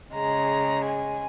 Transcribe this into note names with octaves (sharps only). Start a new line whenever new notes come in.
C#3 G#3 A#5
G#5